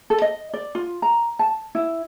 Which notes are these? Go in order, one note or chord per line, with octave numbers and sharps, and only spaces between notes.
A4
D#5
D5
F4
A#5
A5
E4